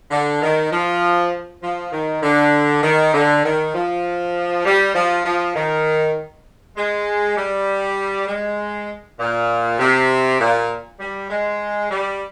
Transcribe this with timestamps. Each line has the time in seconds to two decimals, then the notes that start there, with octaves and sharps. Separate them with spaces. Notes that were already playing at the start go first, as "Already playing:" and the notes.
0.11 D3
0.41 D#3
0.72 F3
1.63 F3
1.92 D#3
2.23 D3
2.83 D#3
3.14 D3
3.44 D#3
3.74 F3
4.65 G3
4.94 F3
5.25 F3
5.55 D#3
6.77 G#3
7.37 G3
8.28 G#3
9.19 A#2
9.79 C3
10.40 A#2
11.00 G3
11.30 G#3
11.91 G3